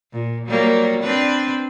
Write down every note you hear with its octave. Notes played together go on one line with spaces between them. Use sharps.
A#2
F#3 G3 A#3
C4 D4 B4